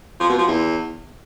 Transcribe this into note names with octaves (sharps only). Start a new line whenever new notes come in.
F3
B2
F3
E2